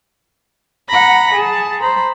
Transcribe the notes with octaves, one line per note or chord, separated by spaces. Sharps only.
F#5 A#5 B5 A#6
G#4 A5
C5 A#5 B5